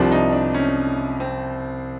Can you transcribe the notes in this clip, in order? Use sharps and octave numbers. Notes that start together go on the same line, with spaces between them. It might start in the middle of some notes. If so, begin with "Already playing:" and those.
Already playing: C2 C3 F3 D4
D#4
D4
C#4
C4